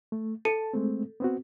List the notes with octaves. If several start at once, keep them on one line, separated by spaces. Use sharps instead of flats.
A3
A4 A5 C#7 D#7
G#3 A3 C4
B3 C4 F#4